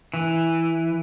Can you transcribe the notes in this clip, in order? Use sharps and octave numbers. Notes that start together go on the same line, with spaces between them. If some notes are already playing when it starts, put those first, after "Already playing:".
E3